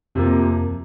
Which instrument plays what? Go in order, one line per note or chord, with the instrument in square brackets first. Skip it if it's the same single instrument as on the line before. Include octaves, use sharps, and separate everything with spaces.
[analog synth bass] F2 [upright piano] C3 F3 A#3